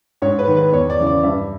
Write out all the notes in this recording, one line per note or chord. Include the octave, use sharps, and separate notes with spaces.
G#2 C#5
B4
D#3
B4
E2 C#5
D5
C#3 E3
D5
G2 E5